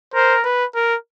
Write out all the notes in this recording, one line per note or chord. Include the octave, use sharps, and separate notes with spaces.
A#4 C5
B4
A#4